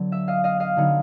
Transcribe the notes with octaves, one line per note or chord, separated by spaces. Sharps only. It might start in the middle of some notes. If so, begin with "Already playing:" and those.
Already playing: D3 F#3 B3
E5
D#5 F5
D#5 F5
D#5 F5
D3 F#3 B3 D#4